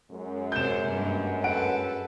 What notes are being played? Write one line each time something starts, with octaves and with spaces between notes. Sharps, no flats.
F#2 G#3
C3 C5 G6 E7
G2 A#3
A4 B4 F#5 D7